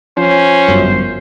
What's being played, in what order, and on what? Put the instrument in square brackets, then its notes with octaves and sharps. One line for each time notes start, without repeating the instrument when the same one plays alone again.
[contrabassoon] F3 [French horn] C#4 [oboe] C5
[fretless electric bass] G1 F#2